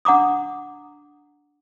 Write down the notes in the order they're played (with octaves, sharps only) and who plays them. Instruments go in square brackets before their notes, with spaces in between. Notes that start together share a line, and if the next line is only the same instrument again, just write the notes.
[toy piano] D4 F#5 A#5 D6 D#6